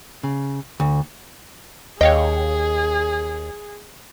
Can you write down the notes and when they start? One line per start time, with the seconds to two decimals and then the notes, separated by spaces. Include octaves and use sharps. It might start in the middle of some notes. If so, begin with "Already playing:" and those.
0.23 C#3
0.80 D2
2.01 D#2 G#4 C#5 D#5 F5 G5